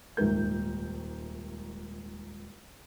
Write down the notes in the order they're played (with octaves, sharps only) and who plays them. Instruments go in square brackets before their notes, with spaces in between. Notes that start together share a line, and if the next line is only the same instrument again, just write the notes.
[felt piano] D#1 C#2 G#2 A3 A#4 G6